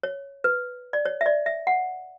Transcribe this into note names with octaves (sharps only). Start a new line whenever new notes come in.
C#5
B4
D5
C#5
E5
D5
E5
F#5